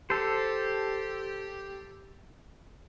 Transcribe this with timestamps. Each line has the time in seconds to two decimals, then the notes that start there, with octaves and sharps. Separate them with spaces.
0.10 G4 A4 C5